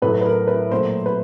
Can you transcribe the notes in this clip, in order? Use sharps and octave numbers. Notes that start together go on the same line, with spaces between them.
A2 F#3 A3 B4
B4
A#4
B4
A#2 F#3 A3 C5
B4